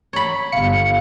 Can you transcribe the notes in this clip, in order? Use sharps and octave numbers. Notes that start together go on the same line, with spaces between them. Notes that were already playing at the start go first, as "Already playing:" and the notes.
C#5 B5
G1 F5 C#7